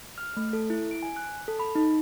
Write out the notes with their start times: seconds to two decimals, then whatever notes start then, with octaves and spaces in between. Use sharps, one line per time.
0.18 F6
0.37 A3
0.53 A4
0.70 E4
0.91 D7
1.03 G#5
1.16 F#6
1.48 A4
1.59 B5
1.75 D#4